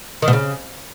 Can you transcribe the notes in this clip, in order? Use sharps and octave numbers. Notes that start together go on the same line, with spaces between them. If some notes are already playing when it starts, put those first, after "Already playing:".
D#3
B2
C#3